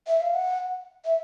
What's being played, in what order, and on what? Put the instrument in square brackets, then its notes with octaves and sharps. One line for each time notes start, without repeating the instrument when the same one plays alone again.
[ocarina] E5
F5
F#5
E5